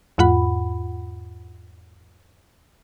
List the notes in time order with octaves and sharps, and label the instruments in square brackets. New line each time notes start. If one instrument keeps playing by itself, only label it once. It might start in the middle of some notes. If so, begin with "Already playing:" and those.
[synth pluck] E2 G#2 F4 F#5 B5